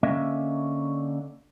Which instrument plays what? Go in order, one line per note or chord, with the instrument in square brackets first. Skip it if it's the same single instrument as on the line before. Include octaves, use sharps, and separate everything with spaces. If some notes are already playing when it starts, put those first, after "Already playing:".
[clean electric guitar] D3 A#3 C#4 D#5 E5